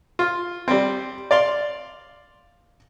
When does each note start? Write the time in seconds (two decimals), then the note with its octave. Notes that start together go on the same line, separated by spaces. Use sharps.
0.19 F4
0.68 G3 C4
1.31 D5 F5 C6